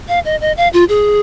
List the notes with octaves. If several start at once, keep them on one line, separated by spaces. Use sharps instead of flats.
F5
D#5
D#5
F5
F4
G#4